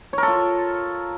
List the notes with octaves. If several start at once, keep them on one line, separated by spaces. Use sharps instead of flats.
F4 A4 A#4 C#5